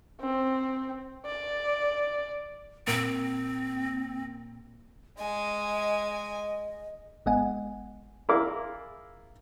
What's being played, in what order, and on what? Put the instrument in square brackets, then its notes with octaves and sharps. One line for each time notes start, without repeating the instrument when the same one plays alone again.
[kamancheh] C4
D5
[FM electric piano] A#2 A#3 [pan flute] C4
[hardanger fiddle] G#3 G#5 [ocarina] D#5
[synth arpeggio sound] G1 G#3 B3 D#5 F#5 G#5
[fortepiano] E4 F4 G#4 A#4 F5 D6